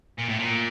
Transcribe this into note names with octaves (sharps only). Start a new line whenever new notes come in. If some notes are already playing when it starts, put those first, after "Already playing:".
A#2
A2
A#2